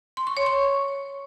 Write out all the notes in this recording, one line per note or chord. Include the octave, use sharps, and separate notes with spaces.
C6
C#6
C#5
C#6